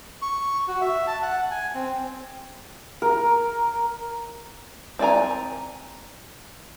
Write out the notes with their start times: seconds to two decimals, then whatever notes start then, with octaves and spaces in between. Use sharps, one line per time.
0.22 C#6
0.68 F#4
0.81 E5
1.07 A5
1.22 F#5
1.51 G#5
1.75 C4
3.02 A#4
4.99 C4 D5 G#5 A#5